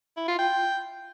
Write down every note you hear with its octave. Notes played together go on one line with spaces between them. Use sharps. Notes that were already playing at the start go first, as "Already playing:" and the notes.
E4
F4
G5